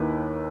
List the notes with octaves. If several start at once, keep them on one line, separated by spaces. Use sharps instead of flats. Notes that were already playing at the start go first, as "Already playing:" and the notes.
Already playing: D#2 D#3 A#3 E4 B4